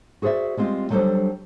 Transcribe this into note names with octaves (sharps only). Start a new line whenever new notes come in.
F#4 G#4 C5 D5 E5
G3 G#3 C4 F4
F#3 G3 D4 A4 C5 D5